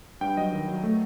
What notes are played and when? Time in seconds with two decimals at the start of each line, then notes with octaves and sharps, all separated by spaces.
0.21 G2 G5
0.37 F#3 D#5
0.52 D#3
0.68 F#3
0.84 A3